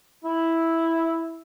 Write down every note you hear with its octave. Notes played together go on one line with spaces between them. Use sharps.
E4